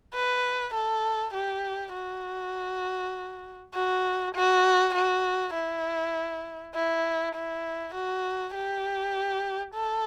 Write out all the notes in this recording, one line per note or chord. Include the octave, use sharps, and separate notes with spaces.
B4
A4
G4
F#4
F#4
F#4
F#4
E4
E4
E4
F#4
G4
A4